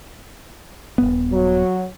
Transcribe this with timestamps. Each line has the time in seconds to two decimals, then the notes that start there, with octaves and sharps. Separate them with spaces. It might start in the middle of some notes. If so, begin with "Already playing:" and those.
0.98 D#1 G2 B3
1.31 F#3